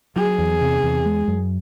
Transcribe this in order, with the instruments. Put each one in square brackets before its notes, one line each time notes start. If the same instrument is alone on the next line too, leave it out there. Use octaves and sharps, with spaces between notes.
[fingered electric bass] F#3 [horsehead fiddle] G#4
[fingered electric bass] E2
C3
E2
G#3
F#2